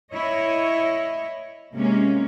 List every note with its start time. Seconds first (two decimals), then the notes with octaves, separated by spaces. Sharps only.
0.14 E4 C#5 D#5
1.75 C3 G#3 A#3 C#4